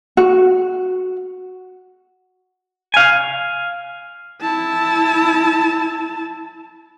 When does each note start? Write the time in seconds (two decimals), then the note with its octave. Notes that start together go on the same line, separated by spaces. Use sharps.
0.17 F#4
2.94 F5 G#5
4.42 E4 A5